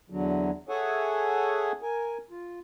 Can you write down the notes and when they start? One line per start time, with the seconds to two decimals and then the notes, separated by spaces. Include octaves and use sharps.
0.10 E2 D3 F#3
0.69 G#4 A4 C#5 E5 F#5 G#5
1.82 A#4 G#5
2.30 F4